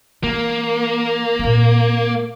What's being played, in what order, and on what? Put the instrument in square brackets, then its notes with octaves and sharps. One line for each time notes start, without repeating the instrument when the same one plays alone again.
[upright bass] E3 [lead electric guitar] A#3
[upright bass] A#2 C4